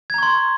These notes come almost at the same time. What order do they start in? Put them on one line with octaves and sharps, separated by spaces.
G#6 A#5 C#6 C6